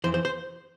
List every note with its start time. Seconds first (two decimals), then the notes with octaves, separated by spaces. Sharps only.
0.04 F2 E3 C5
0.14 C5
0.25 C5